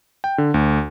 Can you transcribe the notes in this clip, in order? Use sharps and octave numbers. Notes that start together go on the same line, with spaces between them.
G5
D3
D2